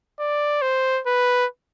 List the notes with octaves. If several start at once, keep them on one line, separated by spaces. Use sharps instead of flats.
D5
C5
B4